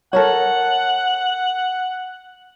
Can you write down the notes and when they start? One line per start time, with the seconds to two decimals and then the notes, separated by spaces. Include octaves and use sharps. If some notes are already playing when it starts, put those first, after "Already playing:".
0.13 A4 A#4 C#5 F#5